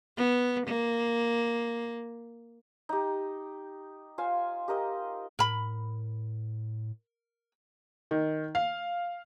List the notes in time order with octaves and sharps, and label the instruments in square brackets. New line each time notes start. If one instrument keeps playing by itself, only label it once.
[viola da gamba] B3
A#3
[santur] D#4 G4
F4 C5 F5 G#5
G4 A#4 D#5
[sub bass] A2 [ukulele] A#4 B5
[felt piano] D#3
F5